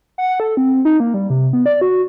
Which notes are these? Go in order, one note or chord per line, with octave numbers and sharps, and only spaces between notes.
F#5
A4
C4
D#4
A#3
G3
C3
B3
D5
F#4